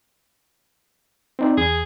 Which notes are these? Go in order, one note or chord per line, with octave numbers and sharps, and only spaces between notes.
C4 D#4 D5
E2 G#4 D#6